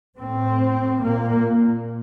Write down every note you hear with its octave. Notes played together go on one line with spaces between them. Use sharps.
A2 C4
A#2 A#3